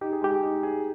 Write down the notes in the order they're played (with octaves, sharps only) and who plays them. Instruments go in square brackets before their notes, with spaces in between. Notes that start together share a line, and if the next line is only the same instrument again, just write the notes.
[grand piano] D#4 [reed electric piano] G4
[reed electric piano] G#4
[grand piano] G#3 [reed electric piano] G4
[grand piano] D#4
G#4